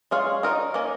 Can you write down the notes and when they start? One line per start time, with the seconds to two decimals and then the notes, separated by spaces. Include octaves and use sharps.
0.11 G#3 F4 G#4 C#5 F5
0.43 D#4 A#4 D#5
0.74 A#3 C#4 A#4 D#5